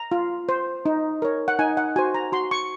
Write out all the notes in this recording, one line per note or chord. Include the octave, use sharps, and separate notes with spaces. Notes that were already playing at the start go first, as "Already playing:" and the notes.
Already playing: A#5
F4
C5
D#4
A#4 C#5
F#5
D#4 G#5
F#5
F#4 C5 G#5
A#5
F#4 C6
C#6